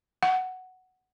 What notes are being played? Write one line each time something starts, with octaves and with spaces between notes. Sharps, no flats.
F#5